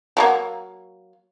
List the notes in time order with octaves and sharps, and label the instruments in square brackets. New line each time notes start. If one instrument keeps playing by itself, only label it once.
[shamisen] F#3 A3 A#3